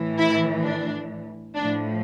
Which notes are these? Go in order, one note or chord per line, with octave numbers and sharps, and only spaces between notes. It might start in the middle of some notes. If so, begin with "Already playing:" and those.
Already playing: A2 E3
E4
D4
A2 F3 D4